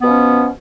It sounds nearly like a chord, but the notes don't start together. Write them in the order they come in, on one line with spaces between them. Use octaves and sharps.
B3 B2 F3 C#4